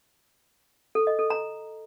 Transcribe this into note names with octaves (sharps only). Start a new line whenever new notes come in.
A4
D#5
A4
A#5